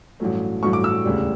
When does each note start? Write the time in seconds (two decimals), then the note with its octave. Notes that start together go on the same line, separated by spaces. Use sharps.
0.20 A1 G2 F#3 A3
0.62 A1 G2 F#3 A3 C#6
0.73 D6
0.84 E6
1.05 E1 D2 C#3 G3